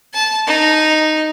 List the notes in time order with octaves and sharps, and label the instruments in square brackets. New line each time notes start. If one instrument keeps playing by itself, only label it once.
[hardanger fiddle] A5
D#4